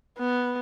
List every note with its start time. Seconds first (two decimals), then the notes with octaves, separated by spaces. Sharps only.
0.18 B3